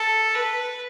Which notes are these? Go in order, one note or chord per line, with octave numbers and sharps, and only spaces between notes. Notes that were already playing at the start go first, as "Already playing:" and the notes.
Already playing: A4
B4